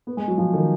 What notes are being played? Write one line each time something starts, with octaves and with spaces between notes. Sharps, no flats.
B3
G#3
F#3
F3
D#3